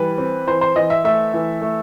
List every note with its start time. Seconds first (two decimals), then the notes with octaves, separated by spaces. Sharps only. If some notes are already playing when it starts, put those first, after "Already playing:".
Already playing: E3 G3 B4
0.18 C4
0.47 E3 C5
0.61 C5
0.76 E3 D#5
0.90 E5
1.04 A3 E5
1.34 E3
1.61 A3